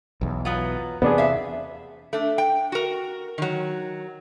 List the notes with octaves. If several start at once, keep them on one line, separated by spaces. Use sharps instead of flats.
B1 E2
F#3 B3 F4
E2 C3 B3 D4 G#4
E5 F5
A3 D4
G5
F#4 A#4
D#3 F#3